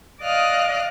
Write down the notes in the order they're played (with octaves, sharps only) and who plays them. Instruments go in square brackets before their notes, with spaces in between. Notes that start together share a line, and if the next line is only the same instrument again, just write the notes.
[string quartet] D5 D#5 F5 D#6 F6 F#6